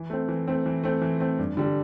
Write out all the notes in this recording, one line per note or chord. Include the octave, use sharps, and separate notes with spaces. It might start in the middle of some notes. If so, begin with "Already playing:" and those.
Already playing: E3
A3 C4
E3
A3 C4
E3
A3 C4
E3
A3 C4
G2
D3 G3